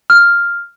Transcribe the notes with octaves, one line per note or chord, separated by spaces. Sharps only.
F6